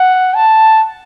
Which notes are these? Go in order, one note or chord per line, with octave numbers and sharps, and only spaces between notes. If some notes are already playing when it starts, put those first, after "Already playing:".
Already playing: F#5
A5